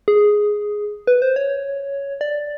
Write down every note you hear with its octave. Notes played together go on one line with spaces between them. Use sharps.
G#4
B4
C5
C#5
D5